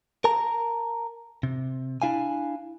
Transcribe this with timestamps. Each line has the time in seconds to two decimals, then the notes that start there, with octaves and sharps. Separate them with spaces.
0.24 A#4 A5 A#5
1.43 C3
2.02 D4 E4 F5 G#5